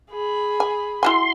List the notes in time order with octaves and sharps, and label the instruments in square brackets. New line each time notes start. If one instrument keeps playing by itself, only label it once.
[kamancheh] G#4 B5
[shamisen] G#5
[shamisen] E4 F#4 G#5 [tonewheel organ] C6